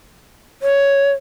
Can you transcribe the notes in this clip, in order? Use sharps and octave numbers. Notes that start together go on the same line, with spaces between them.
C#5